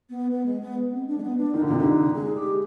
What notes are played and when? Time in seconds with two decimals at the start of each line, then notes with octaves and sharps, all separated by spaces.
0.10 B3
0.31 B3
0.46 G#3
0.61 B3
0.92 C4
1.07 D4
1.18 G#3
1.23 B3
1.37 D4
1.54 D#3 D#4
1.62 D3 F4
1.70 C3
1.77 D3 D#4
2.14 G#3 G#4
2.35 G4